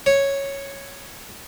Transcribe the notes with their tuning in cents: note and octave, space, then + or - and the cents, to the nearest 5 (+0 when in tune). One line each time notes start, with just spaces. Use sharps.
C#5 -5